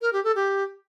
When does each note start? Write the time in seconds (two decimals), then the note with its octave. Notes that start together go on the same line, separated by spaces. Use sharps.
0.02 A#4
0.13 G4
0.24 A4
0.36 G4